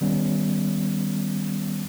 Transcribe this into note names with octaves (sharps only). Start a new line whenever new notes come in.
D#3 G3 B3 C#4